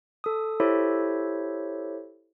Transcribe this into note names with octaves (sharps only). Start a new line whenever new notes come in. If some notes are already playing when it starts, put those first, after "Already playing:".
A4 D#6
E4 G4 A4 C5 C#5 E5